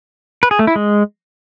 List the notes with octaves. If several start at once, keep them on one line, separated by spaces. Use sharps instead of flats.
B4
G#4
A3
E4
G#3